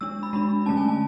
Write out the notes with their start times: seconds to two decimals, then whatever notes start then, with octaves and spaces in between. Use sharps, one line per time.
0.01 G#3 D4 E6
0.23 B5
0.33 G#3 D4 B5
0.66 D3 A3 C#4 A5
0.77 G#5
0.88 A5